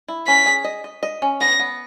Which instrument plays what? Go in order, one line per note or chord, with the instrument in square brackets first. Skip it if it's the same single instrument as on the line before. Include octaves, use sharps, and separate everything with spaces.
[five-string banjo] E4
[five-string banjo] C#4 [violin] B6
[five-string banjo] G#4
D#5
D#5
D#5
C#4
[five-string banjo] B3 [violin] A#6
[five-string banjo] B3